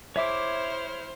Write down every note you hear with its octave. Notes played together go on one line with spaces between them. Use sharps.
E4 G#4 C5 C#5 E5 D6 F6